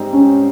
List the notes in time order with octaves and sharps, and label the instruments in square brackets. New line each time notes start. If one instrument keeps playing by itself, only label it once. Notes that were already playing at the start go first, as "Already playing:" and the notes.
Already playing: [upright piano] G#2 G3 C4 D#4
[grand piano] C#4